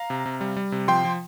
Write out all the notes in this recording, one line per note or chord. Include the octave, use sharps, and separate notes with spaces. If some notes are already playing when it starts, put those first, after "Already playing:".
Already playing: F5 A#5
C3
C3
G3
G3
C3
F3 G5 C6
F3